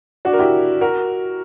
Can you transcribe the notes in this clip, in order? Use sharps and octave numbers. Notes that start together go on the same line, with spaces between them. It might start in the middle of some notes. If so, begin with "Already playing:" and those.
D4 F#4
A#4
E4 G4
F#4 A#4